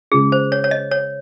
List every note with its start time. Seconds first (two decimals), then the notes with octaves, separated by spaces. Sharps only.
0.12 C#3 G#3 C#4 F4 G#4
0.32 C5
0.52 C#5
0.64 C#5
0.71 D#5
0.91 C#5